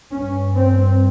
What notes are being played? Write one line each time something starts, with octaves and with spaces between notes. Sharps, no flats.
G2 C#4
C4